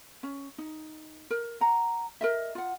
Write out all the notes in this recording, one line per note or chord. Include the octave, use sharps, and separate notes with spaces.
C#4
D#4
A#4
F#5 A#5
A#4 D#5 E5
F4 F#5